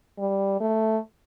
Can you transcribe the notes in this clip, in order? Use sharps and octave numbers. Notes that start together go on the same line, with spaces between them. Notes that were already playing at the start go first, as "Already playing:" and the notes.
G3
A3